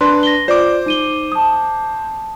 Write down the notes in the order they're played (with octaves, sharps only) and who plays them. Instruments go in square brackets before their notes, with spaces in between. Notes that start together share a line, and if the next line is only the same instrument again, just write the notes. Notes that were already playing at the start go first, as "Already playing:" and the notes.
[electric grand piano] D4 B4 [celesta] C6
[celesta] A#6 G7
[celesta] F4 D5 [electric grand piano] C5 D6
[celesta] D#4 D#7 G7
A5 D#6